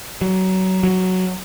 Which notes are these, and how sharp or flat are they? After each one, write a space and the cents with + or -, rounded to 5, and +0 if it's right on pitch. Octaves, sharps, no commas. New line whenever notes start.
F#3 +20
F#3 +5